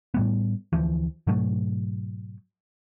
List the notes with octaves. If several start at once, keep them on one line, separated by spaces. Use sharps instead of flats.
A2 G3 B3
D2 E3 F3
G#2 B2 F#3 A3